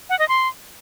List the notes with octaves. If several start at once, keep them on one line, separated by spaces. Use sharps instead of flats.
F#5
D#5
C6